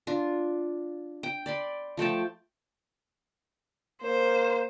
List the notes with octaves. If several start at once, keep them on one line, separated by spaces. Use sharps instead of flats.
D4 F4
G5
D5 B5 C6
F3 A3 G5 A5
A#3 C5